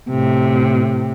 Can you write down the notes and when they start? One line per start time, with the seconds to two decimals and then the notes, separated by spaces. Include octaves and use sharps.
0.10 A2 C3